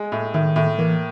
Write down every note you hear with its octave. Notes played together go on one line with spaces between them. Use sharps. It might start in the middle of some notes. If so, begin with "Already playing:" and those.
Already playing: G#3
A2
A2 D#3
A2
E3 A#3